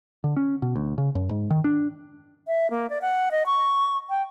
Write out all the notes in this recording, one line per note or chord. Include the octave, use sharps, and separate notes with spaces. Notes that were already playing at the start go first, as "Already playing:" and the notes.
D3
C#4
B2
D2
C#3
F#2
G#2
D#3
D4
E5
A#3
D5
F#5
D#5
C#6
G5